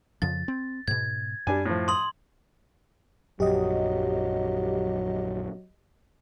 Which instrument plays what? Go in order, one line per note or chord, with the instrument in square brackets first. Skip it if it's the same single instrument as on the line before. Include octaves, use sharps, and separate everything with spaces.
[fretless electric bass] F2 C#3 F3 [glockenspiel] A6
[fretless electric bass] C4
[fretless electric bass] G#2 B2 [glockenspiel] G#6
[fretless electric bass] F#2 [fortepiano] G3 D4 G#5
[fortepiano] A2 F3
[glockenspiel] C6 F#7 [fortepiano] D#6
[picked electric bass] A#1 F#2 [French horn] F#3 [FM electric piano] G4 D#5